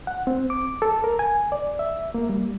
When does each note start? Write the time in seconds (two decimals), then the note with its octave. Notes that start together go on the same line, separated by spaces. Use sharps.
0.07 F#5
0.27 C4
0.50 D6
0.82 A4
1.04 A#4
1.19 G#5
1.52 D5
1.79 E5
2.14 A#3
2.29 G3